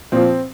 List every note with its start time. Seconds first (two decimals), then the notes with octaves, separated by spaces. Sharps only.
0.12 A#2 F3 C4